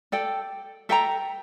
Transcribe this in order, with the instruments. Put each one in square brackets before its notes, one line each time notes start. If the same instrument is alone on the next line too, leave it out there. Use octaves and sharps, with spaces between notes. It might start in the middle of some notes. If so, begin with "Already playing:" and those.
[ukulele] A4 D5 G5
A4 E5 G5 A#5